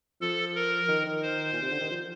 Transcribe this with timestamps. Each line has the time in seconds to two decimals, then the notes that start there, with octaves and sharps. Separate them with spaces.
0.21 F3 A4
0.56 A#4
0.89 D#3
1.06 D#3
1.23 C5
1.53 A#2
1.62 C3
1.71 D3
1.80 D#3
1.91 F3